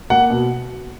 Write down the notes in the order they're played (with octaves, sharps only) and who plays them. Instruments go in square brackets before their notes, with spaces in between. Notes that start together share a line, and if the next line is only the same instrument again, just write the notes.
[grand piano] A#3 F#5
B2